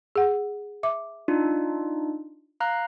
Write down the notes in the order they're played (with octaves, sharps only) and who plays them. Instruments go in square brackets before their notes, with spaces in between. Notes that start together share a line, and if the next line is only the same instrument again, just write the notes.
[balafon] G#4 F#5
E5 D6
[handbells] D4 D#4 F4
F5 A#5 F#6